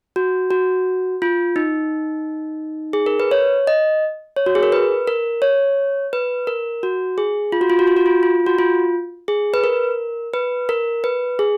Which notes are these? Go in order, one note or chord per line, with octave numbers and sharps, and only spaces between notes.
F#4
F#4
F4
D#4
G#4
A#4
B4
C#5
D#5
C#5
F#4
G#4
A#4
B4
A#4
C#5
B4
A#4
F#4
G#4
F4
F#4
F4
F#4
F4
F#4
F4
F4
F#4
F4
G#4
B4
A#4
B4
A#4
B4
G#4